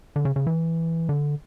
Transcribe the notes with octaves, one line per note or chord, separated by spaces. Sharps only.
D3
C#3
C#3
E3
D3